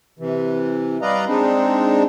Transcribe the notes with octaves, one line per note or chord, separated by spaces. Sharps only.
C3 E3
G3 B4 D5 D#5 F5 A#5
G#3 C4 D4 D#4